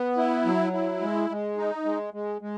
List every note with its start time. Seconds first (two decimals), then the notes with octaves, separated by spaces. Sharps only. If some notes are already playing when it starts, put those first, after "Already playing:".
Already playing: B3
0.17 E4
0.45 F#3
0.73 E4
1.01 G#3
1.30 G#3
1.57 D#4
1.85 G#3
2.14 G#3
2.42 G#3